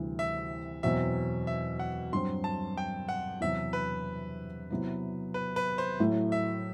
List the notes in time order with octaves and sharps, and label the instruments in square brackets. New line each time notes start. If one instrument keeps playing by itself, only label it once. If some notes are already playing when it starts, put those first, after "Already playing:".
Already playing: [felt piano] D2 C3 E3 G3
[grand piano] E5
[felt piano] E2 B2 F#3 C4 [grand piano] E5
[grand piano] E5
F#5
[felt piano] G2 F#3 C4 [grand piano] C6
[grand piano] A5
G5
F#5
[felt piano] E2 C3 F#3 [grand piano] E5
[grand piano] B4
[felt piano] C3 F#3 B3 E4
[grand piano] B4
B4
C5
[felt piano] A2 F#3 A3 E4
[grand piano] E5